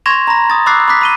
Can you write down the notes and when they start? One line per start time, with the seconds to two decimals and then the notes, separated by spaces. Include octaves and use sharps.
0.06 C6 C#6 G#6 A#6 E7 F7
0.27 A#5 B5 A#6
0.50 D#6 A6
0.66 B5 D6 E6 F#6 A6 C7
0.88 B5 D6 F#6 B6
1.01 B5 D#7 G7